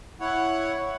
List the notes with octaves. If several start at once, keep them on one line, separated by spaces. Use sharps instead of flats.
E4 C#5 F#5